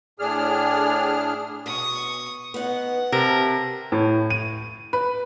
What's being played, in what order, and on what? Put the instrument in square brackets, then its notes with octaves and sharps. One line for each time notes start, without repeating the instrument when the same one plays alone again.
[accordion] A2 D4 G#4 F6
[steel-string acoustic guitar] B2 [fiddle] C#6 D#6
[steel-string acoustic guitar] B3 D#4 [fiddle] F#5
[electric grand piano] C3 [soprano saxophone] A#4 [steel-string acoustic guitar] A5
[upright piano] A2
D#7
B4